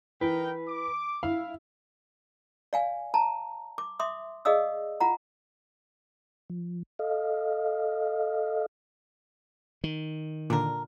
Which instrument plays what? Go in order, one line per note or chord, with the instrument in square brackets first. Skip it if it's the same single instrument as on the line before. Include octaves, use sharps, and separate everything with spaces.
[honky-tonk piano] E3 [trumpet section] D#4 A#4 G5 [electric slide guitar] B4
[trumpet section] D6
[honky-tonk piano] E4 [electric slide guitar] F5
[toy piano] D5 F5 G#5
A5 A#5
D6
E5 C6 D6 D#6
G#4 D5 D#5 F5 D#6 E6
F4 F#5 A#5
[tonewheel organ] F3
A4 D#5 F5
[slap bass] D#3
[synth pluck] A#2 D3 [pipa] D4 A#4